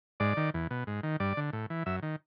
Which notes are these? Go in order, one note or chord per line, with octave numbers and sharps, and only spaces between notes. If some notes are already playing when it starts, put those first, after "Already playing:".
G#2 D5
D#3
E2
B2
G#2
D#3
G2 D5
D3
A2
E3
F#2 E5
D#3